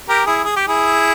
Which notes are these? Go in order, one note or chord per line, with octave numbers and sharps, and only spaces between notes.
G4 A#4
E4 G#4
G#4
G4
E4 G#4